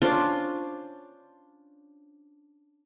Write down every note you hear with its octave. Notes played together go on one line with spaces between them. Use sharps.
C#4 D4 F4 C5